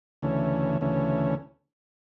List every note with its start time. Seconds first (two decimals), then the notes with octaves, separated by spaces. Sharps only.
0.22 D2 C#3 E3 A3 C#4
0.81 D2 C#3 E3 A3 C#4